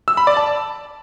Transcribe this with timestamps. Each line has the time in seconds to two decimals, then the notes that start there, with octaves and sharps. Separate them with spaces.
0.08 E6
0.17 B5
0.27 D5
0.37 A5